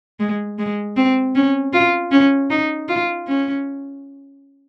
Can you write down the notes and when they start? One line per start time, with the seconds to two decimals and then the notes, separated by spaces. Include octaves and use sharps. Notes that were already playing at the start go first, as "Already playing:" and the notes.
0.20 G#3
0.59 G#3
0.97 C4
1.35 C#4
1.73 F4
2.11 C#4
2.50 D#4
2.89 F4
3.28 C#4